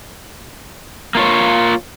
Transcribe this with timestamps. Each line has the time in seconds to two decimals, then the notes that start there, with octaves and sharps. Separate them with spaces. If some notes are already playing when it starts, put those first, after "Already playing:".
1.15 A#3 F4 C#5